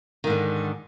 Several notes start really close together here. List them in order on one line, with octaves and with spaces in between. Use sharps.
D#3 G#2 D3